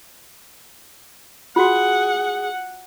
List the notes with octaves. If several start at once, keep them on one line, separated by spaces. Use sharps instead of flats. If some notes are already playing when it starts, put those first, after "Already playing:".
F4 F#4 G#4 F#5